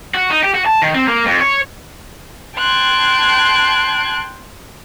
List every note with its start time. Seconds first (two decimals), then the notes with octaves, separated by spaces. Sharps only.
0.14 F#4
0.30 D#4
0.43 G4
0.54 F#4
0.66 A5
0.82 D#3
0.94 C4
1.08 A#3
1.26 F2
1.40 C#5
2.57 G5 A5 C6 F#6 G#6